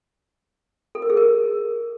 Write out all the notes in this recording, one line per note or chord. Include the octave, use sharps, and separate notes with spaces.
A4
A#4
G#4
A#4